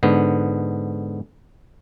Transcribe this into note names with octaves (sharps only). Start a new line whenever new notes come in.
G#2 D3 B3